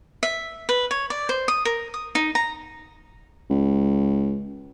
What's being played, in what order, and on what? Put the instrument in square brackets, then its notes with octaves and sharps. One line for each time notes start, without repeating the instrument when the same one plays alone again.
[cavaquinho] E5
B4
C#5
D5
C5
D#6
A#4
D#6
D#4
A#5
[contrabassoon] C#2